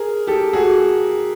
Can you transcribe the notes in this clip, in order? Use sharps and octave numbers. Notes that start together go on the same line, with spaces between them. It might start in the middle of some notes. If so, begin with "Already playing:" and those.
Already playing: G#4 A#4
G4 A4
F#4 G#4